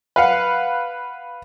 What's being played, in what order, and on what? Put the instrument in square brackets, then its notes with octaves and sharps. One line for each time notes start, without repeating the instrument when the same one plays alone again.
[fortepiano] B4 F5 F#5